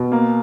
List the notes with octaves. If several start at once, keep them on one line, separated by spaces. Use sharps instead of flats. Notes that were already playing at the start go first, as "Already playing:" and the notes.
Already playing: B2
A#3